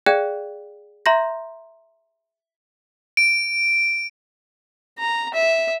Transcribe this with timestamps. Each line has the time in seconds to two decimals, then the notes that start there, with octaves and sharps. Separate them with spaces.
0.06 G#4 D5 F5 G5 F#6 G#6
1.06 E5 A#5 C6 G6 A#6
3.17 D7
4.99 A#5
5.34 E5